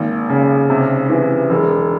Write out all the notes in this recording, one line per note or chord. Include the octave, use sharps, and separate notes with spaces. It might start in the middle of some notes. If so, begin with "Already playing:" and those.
Already playing: G#1 A#3
C#3
C3
E3
E1